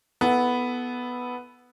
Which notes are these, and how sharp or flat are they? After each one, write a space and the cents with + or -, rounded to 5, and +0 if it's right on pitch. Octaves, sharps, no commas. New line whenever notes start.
B3 +0 E4 +0 A4 -15